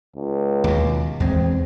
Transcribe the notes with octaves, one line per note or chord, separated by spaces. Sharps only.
C#2
D#2 B2
E2 G#3 C4